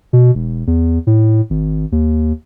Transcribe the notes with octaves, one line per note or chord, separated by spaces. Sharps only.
B2
E1
E2
A2
G#1
D#2